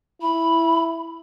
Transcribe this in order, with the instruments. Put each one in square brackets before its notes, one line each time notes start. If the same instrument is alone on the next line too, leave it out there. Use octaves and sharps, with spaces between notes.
[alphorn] E4 [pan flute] B5